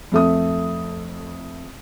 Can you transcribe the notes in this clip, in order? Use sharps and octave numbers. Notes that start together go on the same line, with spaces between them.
F2 A3 D#6